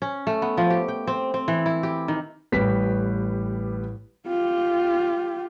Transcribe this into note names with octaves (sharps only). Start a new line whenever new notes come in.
C#4
A3
B3
F3
G4
G5
C4
C4
E3
E4
G4
D#3
A1 G3 G4 B4 B6
F4 G4